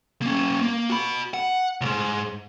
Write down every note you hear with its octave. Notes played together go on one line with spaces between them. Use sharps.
A#3 C#4
A#3
F#4 B5
F#5
C#2 G#2